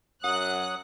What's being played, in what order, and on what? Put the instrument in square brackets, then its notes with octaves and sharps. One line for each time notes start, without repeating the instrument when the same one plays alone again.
[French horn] F#2 [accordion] F#3 D#6 [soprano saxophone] F#5 [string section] F#6